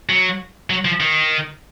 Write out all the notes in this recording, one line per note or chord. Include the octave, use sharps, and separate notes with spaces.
F#3
F#3
F3
D#3